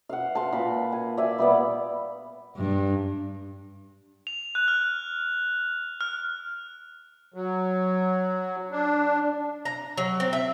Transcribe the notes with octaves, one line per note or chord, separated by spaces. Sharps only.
F5 F#5
A5 C6
A#2 B5
G#5
D5 E5 G#5
G3 B3 D5
G2
F7
F#6
F6
F6
F#3
D4
A#5
F#3
C4
E5